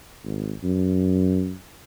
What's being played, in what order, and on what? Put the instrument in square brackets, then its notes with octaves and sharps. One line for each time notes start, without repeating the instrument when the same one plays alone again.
[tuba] G#1
F#2